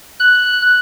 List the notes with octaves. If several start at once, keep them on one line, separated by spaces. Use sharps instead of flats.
F#6